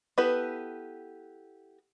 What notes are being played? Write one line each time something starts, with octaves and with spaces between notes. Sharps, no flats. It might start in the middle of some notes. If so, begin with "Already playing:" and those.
B3 E4 G4 A4 B4